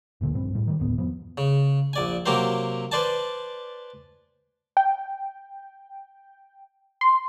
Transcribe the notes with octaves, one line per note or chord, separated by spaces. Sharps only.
F#1 D2 A#2 D3
D#1 A#1 G2 C4
A2 G3
D#3 G3
F1 D2 A2 B3
F2 F3 G3 B3
C#3
A#1 D5 G#5
C3 F#3 A#3 G4 A#4 C5
B4 C5 D5 G#5 A5
G5
C6